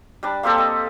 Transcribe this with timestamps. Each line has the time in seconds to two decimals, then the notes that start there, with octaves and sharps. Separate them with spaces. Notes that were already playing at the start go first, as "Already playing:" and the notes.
0.23 G3 D4
0.43 A#3 C4 G4 A4
0.58 D#5